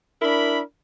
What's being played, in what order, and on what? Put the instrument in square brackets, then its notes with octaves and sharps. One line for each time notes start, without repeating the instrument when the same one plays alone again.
[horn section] D4 E4 A#4 B5